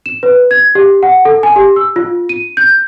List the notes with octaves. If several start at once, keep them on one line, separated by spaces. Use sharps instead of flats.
E7
B4
G#6
G4
F#5
A4
G#5
G4
E6
F4
D#7
G6